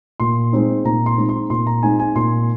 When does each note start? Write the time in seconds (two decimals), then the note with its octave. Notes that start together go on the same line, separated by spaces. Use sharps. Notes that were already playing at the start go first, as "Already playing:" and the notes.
0.20 A#2 C6
0.53 G#3 C4 D#4
0.85 A#2 A#5
1.06 C6
1.17 G#3 C4 D#4
1.29 C6
1.50 A#2 C6
1.67 A#5
1.83 G#3 C4 D#4 G#5
1.99 G#5
2.15 A#2 C6